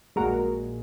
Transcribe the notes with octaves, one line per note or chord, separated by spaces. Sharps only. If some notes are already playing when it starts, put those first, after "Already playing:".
A#1 A#2 G#3 F#4 A#4